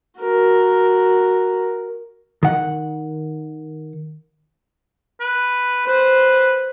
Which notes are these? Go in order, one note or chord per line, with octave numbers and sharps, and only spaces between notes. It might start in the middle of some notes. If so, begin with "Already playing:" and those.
F#4 A#4
D#3 F#5
B4
B4 C5